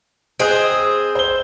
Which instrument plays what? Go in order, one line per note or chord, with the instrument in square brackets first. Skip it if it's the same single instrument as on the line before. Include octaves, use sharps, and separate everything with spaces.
[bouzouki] C4 G#4 [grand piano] D#5 D#6 F#6
[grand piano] D#6
C5 G7